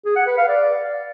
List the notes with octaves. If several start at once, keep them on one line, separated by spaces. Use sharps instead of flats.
G#4
F#5
B4
F5
D5